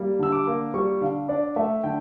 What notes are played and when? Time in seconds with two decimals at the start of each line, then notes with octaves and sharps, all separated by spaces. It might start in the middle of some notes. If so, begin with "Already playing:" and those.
Already playing: G3 A#3
0.19 D3 E6
0.32 D6
0.47 A#3
0.74 G3 C#6
1.01 D3 F5
1.28 D4 D5
1.56 A3 E5
1.84 D3 G5